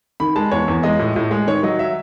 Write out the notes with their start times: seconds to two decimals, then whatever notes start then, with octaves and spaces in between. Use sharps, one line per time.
0.20 D#3 B5
0.36 G#3 A5
0.52 E2 C#5
0.68 E2
0.83 G#3 D#5
0.99 A2
1.16 A2
1.31 G#3
1.47 D#3 C#5
1.63 F#3 D#5
1.79 E5